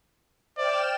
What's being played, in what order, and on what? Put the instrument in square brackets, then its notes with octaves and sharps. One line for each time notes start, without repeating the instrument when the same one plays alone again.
[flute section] C5 E5 [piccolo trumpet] D5 [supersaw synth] G5 F6 E7